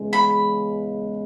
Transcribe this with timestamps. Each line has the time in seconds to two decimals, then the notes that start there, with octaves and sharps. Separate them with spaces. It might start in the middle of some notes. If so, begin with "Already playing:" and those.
Already playing: E2 C#3 G#3
0.13 B5